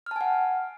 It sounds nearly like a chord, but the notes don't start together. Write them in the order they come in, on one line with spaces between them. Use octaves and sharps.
F6 A5 G#5 F#5